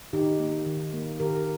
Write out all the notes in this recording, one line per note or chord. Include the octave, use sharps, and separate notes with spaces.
D#3 D#4 G4
A#3
D#3
A#3
D#3 G4 A#4